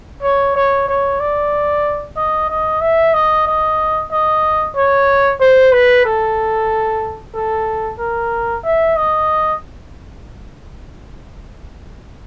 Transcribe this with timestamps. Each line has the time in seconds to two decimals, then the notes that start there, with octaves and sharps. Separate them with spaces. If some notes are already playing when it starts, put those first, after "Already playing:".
0.23 C#5
0.55 C#5
0.88 C#5
1.20 D5
2.16 D#5
2.49 D#5
2.81 E5
3.13 D#5
3.47 D#5
4.11 D#5
4.76 C#5
5.40 C5
5.72 B4
6.05 A4
7.34 A4
7.99 A#4
8.64 E5
8.96 D#5